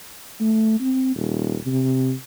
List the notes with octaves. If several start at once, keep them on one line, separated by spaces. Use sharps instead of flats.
A3
C4
D#1
C3